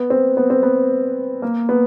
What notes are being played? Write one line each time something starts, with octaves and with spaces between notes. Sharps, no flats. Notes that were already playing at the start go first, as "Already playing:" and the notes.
Already playing: B3
C4
B3
C4
B3
A#3
B3